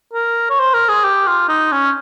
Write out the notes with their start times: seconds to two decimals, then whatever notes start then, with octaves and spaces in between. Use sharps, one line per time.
0.14 A#4
0.50 C#5
0.60 C5
0.74 A#4
0.89 G#4
1.05 G4
1.27 F4
1.49 D#4
1.72 C#4